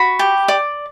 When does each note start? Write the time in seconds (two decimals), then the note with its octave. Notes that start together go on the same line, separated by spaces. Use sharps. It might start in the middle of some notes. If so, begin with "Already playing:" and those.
Already playing: F#4 B5
0.19 G4
0.48 D5